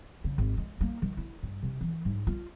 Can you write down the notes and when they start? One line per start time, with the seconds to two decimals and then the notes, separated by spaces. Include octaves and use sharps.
0.24 C#3
0.38 G#1
0.57 G#3
0.81 A#3
1.02 D#3
1.17 E4
1.43 G2
1.63 C3
1.81 E3
2.05 G#2
2.27 F4